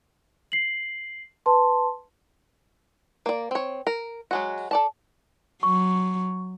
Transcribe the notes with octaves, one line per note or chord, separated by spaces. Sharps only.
C7 F#7
B4 A5 C6
A#3 D5
C4 C#5
A#4
F#3 G#3 F#4
A4 D5 A5
F#3 C#6